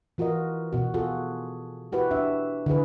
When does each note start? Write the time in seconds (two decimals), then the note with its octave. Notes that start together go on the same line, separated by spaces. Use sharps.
0.18 E3 F4 F#4 A#4 D#5
0.73 B2 F#4
0.94 F4 F#4 G#4 A4
1.92 E4 F#4 G4 B4
2.11 D4 E5
2.66 D3 E4 G#4 B4